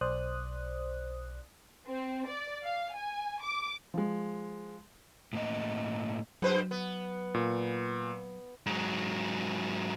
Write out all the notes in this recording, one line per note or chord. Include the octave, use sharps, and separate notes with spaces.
B1 C5 D5 D#6 F#6
C4
D5
F5
G#5
D6
F3 G#3
A2 A#3 D#5
G2 F#3 B4 C5
B3
A#2
G#2 F#3